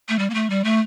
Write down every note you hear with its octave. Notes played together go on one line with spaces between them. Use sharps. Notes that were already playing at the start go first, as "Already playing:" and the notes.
A3
G3
A#3
A3
G3
A3